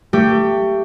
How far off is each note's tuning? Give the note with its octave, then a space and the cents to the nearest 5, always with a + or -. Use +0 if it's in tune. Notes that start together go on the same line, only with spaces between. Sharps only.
A3 +25 G4 +0